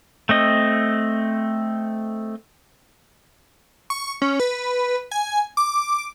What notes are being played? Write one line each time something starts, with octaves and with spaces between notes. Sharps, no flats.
A3 C4 D#5
C#6
C#4
B4
G#5
D6